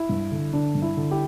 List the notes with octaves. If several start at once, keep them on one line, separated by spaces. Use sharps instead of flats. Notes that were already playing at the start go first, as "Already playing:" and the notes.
Already playing: E4
G2
D3
D3 D4
G2
E4
D3
E4 G4